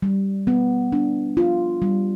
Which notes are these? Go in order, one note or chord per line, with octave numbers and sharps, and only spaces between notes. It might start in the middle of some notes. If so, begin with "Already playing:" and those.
G3
B3
D4
F4
G3